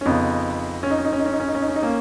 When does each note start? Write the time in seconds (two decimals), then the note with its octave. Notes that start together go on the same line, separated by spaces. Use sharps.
0.01 C#4
0.06 F2 C#3 B3 D#4
0.83 C#4
0.91 D#4
0.98 C#4
1.05 D#4
1.12 C#4
1.19 D#4
1.26 C#4
1.33 D#4
1.40 C#4
1.48 D#4
1.55 C#4
1.62 D#4
1.68 C#4
1.76 D#4
1.82 A#3 C#4